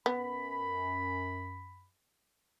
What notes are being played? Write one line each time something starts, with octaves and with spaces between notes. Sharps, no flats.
F#2 B3 B5